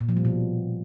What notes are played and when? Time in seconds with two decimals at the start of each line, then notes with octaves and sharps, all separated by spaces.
0.01 A#2
0.09 F3
0.17 G3
0.25 B2